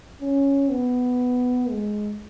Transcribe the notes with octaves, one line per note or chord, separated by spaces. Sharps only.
C#4
B3
G#3